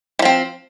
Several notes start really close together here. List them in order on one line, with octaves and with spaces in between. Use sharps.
E3 F3 C4